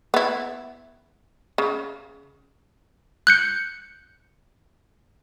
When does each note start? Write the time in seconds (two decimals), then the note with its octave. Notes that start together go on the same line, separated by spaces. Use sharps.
0.14 B3 E4
1.58 C#3
3.27 F#6 G6 C#7